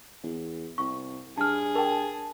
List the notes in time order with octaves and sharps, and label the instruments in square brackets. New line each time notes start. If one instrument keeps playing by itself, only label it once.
[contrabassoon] E2
[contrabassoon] C2 [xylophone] C#6
[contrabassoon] G2 [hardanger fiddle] G#4 [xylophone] A5 F6
[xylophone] A#4 G5 [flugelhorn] A5